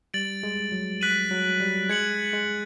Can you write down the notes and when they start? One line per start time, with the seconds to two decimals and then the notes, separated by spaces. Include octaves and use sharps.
0.14 G3 A6 D7 F#7
0.43 G#3
0.72 F#3
1.01 F#6 B6 D#7 F#7
1.31 F#3
1.60 G3
1.89 G#3 G#6 C#7 F#7
2.33 G#3